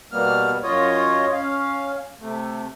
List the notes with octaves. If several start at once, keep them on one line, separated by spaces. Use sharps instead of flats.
B2 G3 A#3 B3 F6
F#2 F4 C#5 D#5
C#4 F5
C3 A3